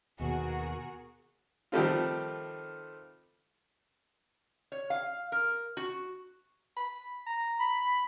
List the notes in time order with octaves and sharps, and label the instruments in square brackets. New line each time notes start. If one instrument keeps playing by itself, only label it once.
[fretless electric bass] D#2 B2 [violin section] F#4 G#4 A#4
[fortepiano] D#3 F3 G3 A3 C4 F4
[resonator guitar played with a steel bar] C#5
F5
A#4
F#4
[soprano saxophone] B5
A#5
[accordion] B5